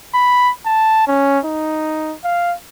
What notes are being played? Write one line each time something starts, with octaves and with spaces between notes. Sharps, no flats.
B5
A5
C#4
D#4
F5